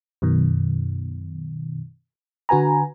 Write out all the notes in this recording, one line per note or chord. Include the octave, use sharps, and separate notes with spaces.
F#2 B2 D#3
D3 F#4 B4 G#5 A#5